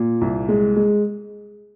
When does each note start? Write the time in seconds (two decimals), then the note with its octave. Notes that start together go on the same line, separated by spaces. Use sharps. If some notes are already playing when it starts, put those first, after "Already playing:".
Already playing: A#2
0.21 C2
0.49 G#3
0.76 G#3